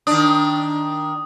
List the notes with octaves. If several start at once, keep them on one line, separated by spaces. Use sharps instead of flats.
D#3 D4 D#6